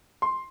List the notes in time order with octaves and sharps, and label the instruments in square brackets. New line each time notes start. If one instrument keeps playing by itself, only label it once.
[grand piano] C6